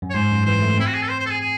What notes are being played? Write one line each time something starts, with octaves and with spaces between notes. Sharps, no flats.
F#2
C#5
G#2 C5
F#2
E3 C5
A3
C4 E4
F#4
G#4
A4
C5
C5
A4
G#4
G#4